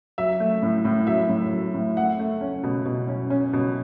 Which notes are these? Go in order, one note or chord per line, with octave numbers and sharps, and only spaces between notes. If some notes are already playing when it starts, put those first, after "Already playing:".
F#3 E5
A3
A2
A2
F#3 E5
A2
F#3
A2
A3 F#5
A3
C#4
B2
B2
C#4
C#4
B2